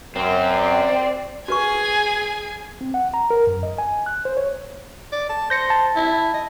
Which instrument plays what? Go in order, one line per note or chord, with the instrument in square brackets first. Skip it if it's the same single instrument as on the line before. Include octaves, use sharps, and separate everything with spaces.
[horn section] F#2 [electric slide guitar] C4
[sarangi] D5
[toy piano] F#4 B4 C#6 [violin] G#4 G#5
[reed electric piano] C4
F#5
A#5
A#4
F#2
D#5
G#5
F#6
C5
C#5
[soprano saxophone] D5
A5
[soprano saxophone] C5 [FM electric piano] G6 A#6 C#7
[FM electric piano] A5
[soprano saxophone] E4
D#5